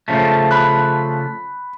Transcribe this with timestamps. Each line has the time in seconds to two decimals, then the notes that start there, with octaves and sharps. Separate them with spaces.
0.08 C#3 F3 A3
0.51 B5 F#6